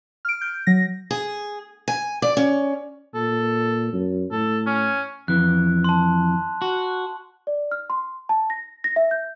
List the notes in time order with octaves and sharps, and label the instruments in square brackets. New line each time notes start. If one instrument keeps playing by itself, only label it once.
[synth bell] F6 D7
G6
F#3 A#6
[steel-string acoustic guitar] G#4
G#5
D5
C#4
[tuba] A#2 [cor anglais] A4
[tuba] F#2
[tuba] A2 [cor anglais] A4
[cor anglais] C#4
[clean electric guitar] F2 E3 [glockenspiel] F#6
[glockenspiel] A5 C6
[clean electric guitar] F#4
[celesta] D5
F6
C6
A5
A#6
A#6
E5
G6